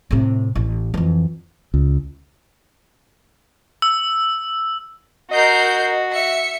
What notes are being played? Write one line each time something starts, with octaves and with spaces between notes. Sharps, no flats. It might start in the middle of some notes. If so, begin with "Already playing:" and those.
A2 C3
A1
F2 E3
C#2
E6
F#4 A#4 D#5 G6 C7
E5 C#7